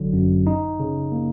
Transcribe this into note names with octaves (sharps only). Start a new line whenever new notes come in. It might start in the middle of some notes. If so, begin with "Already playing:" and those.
Already playing: G1 D3 F#3
F#2
D#4
C#3
A#3